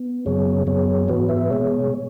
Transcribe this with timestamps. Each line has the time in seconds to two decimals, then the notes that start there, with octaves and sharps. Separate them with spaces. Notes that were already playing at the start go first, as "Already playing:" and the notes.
Already playing: B3
0.26 F#2 C#3 F#3 B3 G#4 C#5
0.67 F#2 F#3 B3 G#4 C#5
1.08 G#2 E3 B3 F#4 B4
1.29 B4 E5
1.50 B2 G#3 B3 G#4 C#5